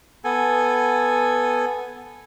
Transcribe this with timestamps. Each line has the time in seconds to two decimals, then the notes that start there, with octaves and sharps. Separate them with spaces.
0.24 B3 A4 G#5